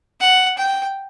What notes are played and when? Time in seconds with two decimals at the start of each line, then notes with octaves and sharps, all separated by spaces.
0.20 F#5
0.57 G5